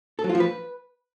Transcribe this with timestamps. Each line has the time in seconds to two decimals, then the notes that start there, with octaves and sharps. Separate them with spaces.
0.19 A4
0.24 F#3
0.29 F4
0.35 F3
0.40 B4